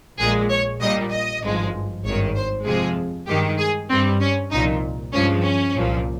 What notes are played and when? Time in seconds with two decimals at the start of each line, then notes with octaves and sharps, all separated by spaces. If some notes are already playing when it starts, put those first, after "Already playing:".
0.20 A#1 A#2 G#3 G#4
0.50 C#5
0.81 A#1 A#2 G3 D#5
1.12 D#5
1.43 G#1 G2 F3 G#3
2.04 G#1 G2 D#3 C#5
2.35 C5
2.66 F2 C3 F3 G#3 G#4
3.28 G2 D#3 G#3 G4
3.59 G#4
3.90 G2 G3 C4
4.21 C#4
4.51 C2 A#2 F3 D#4
5.13 G2 F3 G#3 C#4
5.45 C#4
5.75 C2 A#2 F3